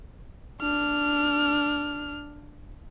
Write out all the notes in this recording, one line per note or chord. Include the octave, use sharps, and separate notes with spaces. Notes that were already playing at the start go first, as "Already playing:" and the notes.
D4 F6